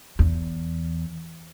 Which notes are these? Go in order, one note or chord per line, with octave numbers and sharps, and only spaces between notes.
E2